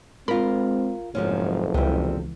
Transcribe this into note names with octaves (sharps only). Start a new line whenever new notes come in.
G#3 C4 F4 A#4 B5
F#1 B1 F2 G#2 F3 C#4
C#2 C3 E3 G3